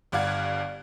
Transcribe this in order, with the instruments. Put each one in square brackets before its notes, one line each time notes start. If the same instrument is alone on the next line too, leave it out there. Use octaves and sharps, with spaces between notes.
[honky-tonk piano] G1 G2 D5 F5 F#5 G#6